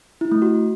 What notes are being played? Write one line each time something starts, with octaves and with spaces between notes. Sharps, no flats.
E4
A3
F#4